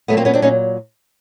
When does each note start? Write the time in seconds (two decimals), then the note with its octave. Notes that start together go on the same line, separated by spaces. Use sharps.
0.08 F#3 A3 B3
0.13 A#2 A#3 C4
0.25 B3 C#4
0.33 C4 D4
0.42 A#2 F#3 C#4 D#4